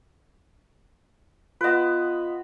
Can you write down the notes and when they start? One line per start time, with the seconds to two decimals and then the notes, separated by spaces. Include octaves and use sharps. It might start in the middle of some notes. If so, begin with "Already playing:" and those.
1.61 B3 F4 B4 D#5